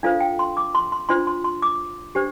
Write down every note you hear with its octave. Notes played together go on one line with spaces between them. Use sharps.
D4 F4 A4 C5 F5
G5
C6
D6
C6
C6
D4 F4 C5 C6
C6
C6
D6
D4 G4 C5